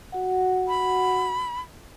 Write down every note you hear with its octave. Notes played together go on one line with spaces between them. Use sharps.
F#4 F#5
B5